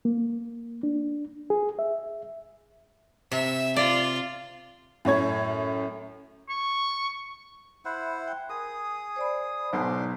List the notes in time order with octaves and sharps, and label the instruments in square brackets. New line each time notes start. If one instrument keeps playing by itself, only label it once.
[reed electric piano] A#3
D4
G#4
E5
[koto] C3 [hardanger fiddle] E5
[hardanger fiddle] F4 [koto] D5
[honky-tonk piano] F#2 A2 C#5 G#6
[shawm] C#6
[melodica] E4 C5 F#5 [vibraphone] E5 B5
[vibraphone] G5
[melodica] G#4 D#6 [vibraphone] A#4
[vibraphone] C5 D5 B5
[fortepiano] B1 G#2 B2 [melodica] D4 C6 D6 [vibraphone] C5 G#5